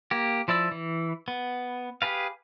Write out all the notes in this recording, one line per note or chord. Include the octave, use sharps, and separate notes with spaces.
A#3 G4
F3 E4 D5 E6
E3
B3
G4 G#4 B4 F5